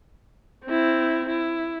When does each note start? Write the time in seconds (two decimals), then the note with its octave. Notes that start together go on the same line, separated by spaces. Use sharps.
0.65 C4 E4
1.29 E4